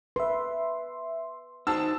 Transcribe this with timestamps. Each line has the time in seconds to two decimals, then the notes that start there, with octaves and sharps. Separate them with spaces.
0.16 B4 E5 C6
1.67 D#4 F#4 C5 A5 E6